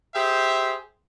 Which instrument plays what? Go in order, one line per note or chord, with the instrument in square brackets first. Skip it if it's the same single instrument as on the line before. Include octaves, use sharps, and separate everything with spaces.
[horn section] G4 G#4 C5 E5